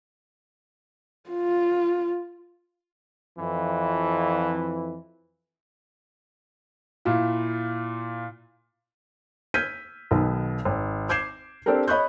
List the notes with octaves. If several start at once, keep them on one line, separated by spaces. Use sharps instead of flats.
F4
F2 E3
A#2 E4 F4
E6 F6 G6 G#6 B6 D#7
B1 B2 D#3
G#1
D6 G6 G#6 C7 E7
C4 D4 G4 A4 A#4
C#5 D#5 B5 C#6 F#6 G6